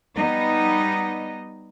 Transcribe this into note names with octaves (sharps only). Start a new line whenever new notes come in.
G3 B3 D#4 D#5